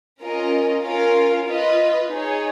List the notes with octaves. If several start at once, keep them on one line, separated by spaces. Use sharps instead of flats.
C#4 F4 A#4 D#5
C#4 F4 A#4 F5
F4 B4 D#5
D#4 G#4 C#5